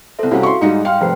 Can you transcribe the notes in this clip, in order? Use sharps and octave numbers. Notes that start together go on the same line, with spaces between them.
C2 A4 C5 E5
C2 C4 C#4 E4 F#4 F5 F#5
C6 C#6
G#2 G3 G#3 D#4 C#7
F5 G5 C6 F6
F1 B4 C5 C7